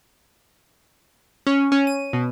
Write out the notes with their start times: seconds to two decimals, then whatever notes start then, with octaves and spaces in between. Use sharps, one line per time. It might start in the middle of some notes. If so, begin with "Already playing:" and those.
1.47 C#4
1.72 C#4
1.87 D#7
2.13 B2